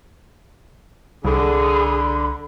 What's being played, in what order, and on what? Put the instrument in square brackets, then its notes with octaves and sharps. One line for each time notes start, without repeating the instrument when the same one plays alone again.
[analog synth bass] C2 [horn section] D3 [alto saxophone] G#4 [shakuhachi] B5